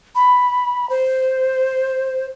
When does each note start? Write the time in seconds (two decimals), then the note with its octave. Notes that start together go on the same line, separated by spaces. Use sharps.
0.15 B5
0.90 C5